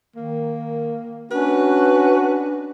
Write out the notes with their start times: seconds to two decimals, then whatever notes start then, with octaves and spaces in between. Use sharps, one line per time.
0.16 D#3 A#3
1.32 C#4 D4 F#4 B4